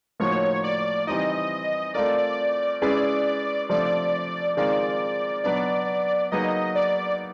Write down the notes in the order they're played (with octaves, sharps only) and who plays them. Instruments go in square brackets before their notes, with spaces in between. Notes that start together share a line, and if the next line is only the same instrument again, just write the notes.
[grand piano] A2 F3 A#3 D#4 F#4 [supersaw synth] C#5
[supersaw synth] D5
[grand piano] E3 G3 C4 D#4 [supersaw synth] D#5
[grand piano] A3 C4 F4 A#4 [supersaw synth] D5
[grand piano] G#3 C#4 E4 G#4 B4 [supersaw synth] D5
[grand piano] C3 F3 A3 D4 [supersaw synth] D5
[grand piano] D#3 G#3 C4 F4 A#4 [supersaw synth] D5
[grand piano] B2 F#3 B3 D4 [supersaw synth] D5
[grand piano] F#3 A#3 D#4 G#4 B4 [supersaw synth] D#5
[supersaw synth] D5